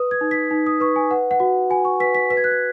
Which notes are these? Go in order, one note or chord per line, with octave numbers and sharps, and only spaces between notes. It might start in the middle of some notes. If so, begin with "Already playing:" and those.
Already playing: B4 D#6
G#6
D#4
B6
D#4
D#6
B4 C#6
G#5
B4 F#5
F#5
F#4
F#4 G#5
C#6
B4 B6
B6
B4 B6
G#6
F#6
G#6